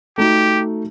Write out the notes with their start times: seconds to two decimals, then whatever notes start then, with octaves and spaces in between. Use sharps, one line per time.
0.18 A3 D#4 F#4 G4